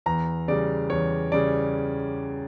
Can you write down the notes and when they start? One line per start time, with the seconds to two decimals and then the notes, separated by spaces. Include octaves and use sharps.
0.06 E2 A#5
0.48 C#3 G3 D5
0.90 E2 C#5
1.32 C#3 G3 D5